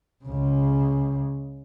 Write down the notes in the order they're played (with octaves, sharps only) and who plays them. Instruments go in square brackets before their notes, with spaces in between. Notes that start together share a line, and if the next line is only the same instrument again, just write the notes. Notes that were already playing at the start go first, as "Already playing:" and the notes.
[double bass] C#2 C#3